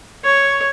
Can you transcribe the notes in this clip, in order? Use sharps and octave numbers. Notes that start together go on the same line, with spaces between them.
C#5